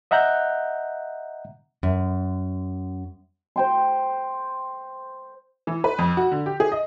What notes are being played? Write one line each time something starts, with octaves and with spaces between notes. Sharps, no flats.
D#5 E5 F#5 A#5 F#6 G6
F#2
C5 G5 C6
E3
B4
F2
F#4
D3
G4
G#4
D#5